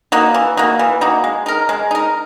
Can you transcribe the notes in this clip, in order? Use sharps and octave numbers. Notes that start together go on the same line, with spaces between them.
A#3 D#4 F#4
E3
A#3 D#4 F#4
E3
A#3 D#4 F#4
G#3
D#4 A#4
G#3
D#4 A#4